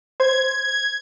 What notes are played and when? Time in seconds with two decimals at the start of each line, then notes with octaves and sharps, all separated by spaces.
0.20 C5 G#6